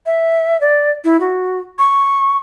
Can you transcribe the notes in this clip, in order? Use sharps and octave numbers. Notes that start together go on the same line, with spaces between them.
E5
D5
E4
F#4
C#6